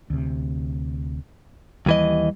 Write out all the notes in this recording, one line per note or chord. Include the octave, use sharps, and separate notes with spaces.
D2 C3
D#2 E3 G3 D#5